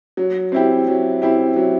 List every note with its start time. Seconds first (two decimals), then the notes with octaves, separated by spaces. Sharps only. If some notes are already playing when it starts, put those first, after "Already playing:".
0.17 F#3
0.52 C4 E4 G4
0.88 F#3
1.22 C4 E4 G4
1.56 F#3